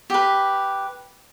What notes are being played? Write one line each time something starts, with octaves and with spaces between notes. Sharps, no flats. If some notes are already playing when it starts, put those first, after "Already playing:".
G4 B4